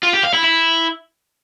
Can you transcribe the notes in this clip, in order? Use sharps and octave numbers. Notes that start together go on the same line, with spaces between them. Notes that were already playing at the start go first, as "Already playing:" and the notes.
F4
G4
F5
E4
E4